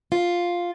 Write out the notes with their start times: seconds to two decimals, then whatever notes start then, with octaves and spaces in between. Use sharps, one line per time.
0.12 F4